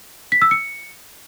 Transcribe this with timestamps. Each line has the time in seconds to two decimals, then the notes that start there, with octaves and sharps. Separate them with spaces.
0.32 B6
0.42 E6
0.51 C#7